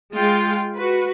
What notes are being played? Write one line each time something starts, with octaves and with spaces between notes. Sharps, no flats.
G#3 F4 G5
F#4 B4